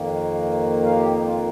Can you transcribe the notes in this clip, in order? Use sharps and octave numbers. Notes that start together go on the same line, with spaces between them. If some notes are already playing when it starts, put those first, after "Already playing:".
Already playing: F2 D#3 A#3
F5
G4
D#4
F4